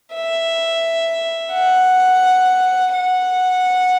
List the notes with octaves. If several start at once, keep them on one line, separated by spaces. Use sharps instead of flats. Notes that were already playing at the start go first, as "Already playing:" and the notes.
E5
F#5
F#5